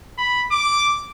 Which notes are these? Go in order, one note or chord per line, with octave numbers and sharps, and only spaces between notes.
B5
D6